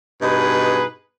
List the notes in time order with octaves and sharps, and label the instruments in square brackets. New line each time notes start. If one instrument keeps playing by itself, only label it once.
[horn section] G2 B2 D#4 G#4 B4